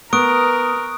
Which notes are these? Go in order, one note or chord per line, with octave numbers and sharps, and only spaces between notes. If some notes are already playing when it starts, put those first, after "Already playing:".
B3 A#4 C#6 D#6 F#6 D7